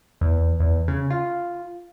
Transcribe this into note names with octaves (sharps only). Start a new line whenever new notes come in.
E2
E2
C#3
F4